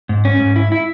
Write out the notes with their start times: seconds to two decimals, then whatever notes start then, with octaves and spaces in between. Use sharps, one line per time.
0.09 G#2
0.25 C#4
0.40 G#2
0.56 E4
0.72 E4